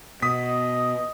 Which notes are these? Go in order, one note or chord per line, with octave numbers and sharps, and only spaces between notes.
B2 D#5 D#6 B6